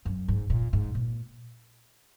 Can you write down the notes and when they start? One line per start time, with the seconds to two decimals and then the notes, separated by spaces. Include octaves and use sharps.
0.05 F#2
0.28 G#2
0.50 A#2
0.73 G#2
0.95 A#2